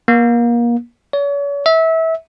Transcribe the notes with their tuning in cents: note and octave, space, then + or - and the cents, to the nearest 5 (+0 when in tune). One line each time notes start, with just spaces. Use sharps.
A#3 +30
C#5 +40
E5 -25